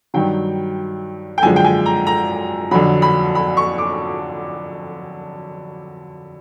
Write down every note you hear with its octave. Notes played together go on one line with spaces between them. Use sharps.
G2 D#3 F#3 G5
G5
F#2 D3 F3 G#3 G#5
G5
G#5
A#5
A#5
F2 D3 F#3 B5
B5
B5
C#6
D6